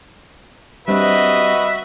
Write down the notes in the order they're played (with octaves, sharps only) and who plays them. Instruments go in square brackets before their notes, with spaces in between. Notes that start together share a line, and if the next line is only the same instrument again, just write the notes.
[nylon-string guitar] G3 C4 D4 [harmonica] F#4 B4 E5 [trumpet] D#5